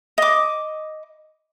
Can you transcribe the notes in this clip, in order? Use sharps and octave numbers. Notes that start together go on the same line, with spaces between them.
D#5 D6